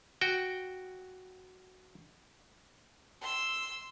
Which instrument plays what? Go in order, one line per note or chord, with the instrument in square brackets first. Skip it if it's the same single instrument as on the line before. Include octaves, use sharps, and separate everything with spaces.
[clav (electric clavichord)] F#4 G5
[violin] C6 E6